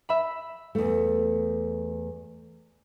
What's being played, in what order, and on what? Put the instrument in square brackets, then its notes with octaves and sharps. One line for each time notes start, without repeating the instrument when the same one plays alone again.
[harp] E5 B5
[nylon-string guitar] E2 A3